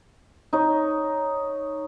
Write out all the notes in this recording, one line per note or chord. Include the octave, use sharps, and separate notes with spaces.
D#4 C#5